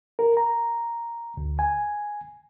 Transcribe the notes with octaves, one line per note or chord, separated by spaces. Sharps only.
A#4
A#5
D2
G#5